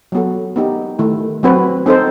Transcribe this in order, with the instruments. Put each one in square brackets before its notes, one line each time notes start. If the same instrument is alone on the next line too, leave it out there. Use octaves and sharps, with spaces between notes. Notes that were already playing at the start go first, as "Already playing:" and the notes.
[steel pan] F#3 B3 F#4 A4
B3 D#4 G4
D#3 A3 E4
F#3 C4 F#4 B4
C4 D#4 A4 C5